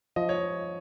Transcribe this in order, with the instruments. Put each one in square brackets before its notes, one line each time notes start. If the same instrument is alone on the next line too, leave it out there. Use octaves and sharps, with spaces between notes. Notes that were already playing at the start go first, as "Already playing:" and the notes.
[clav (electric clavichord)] F3 [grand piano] D#5
[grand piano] C#5